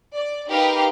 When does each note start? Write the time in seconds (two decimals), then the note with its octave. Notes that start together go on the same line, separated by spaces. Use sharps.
0.13 D5
0.48 D#4 G4 A#4 B4 F5 G5